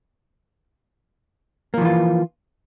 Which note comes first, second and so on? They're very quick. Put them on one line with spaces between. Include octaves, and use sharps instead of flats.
A#3 F3 E3 F4